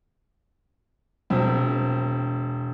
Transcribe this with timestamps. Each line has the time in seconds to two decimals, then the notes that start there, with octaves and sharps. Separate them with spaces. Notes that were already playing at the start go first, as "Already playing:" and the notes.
1.30 E1 C4